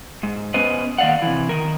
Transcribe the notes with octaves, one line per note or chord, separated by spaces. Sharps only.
G#2
B3 C#4 B4 C5 D#5
D#3 A#3 D5 F5 F#5
C3 E3
D#3 A#4